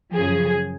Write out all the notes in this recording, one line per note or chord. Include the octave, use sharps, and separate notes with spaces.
F#2 C#3 F3 G#4